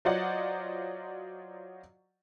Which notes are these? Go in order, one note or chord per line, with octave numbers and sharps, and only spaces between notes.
F#3 F4 C5 D5 D#5 F#5